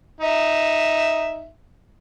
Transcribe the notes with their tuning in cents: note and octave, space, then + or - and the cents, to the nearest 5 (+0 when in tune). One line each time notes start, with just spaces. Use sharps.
D#4 +0 E5 +0